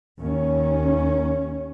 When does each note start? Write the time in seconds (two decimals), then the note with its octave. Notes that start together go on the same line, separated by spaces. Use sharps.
0.19 D#2 C#4